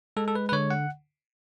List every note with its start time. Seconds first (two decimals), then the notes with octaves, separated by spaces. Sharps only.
0.17 G#3 A4
0.28 A4
0.35 B4
0.49 B4
0.52 D3 C#5
0.71 F#5